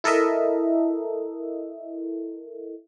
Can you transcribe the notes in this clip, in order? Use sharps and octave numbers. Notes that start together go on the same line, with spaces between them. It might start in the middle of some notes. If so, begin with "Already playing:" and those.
E4 A4 A#4 D#5 E5